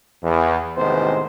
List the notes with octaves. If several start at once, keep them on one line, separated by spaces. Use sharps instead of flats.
E2
A1 C3 D#3 G#3 B3 C5